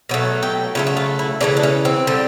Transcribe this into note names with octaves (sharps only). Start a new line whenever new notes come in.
B2 F#3 A3
G4
C#3 F#3 A3 F4
F#4
F4
E4
C#3 E3 A3 D4
D4
C#4
C4
D3 G3